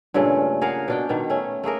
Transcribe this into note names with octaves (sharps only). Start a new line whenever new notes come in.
G2 A#2 C#3 A3
G#4 A#4 F5 F#5
B2 D4 G5
B2 D#3
A3 C#4
A3 A#3 G#4 A#4